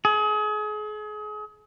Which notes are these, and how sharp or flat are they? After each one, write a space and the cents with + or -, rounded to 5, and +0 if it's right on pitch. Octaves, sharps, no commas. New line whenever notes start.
G#4 +35